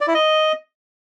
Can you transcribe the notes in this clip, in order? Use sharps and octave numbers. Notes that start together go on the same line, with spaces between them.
D5
E4
D#5